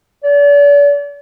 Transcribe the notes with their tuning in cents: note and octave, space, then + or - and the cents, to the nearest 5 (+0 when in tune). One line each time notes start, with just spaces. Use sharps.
D5 -40